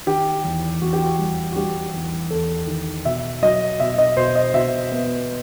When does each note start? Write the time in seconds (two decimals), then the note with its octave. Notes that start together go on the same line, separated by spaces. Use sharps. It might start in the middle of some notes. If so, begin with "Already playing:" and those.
0.06 D#3 G4
0.44 E2
0.81 E2 F#4
0.93 G4
1.04 F#4
1.19 G3
1.52 F#4
1.56 G3 G4
1.94 E2
2.30 E2 A4
2.67 D#3
3.05 B2 E5
3.42 F#3 D#5
3.80 B2 E5
3.98 D#5
4.17 B2 C5
4.35 D#5
4.54 B2 E5
4.92 B3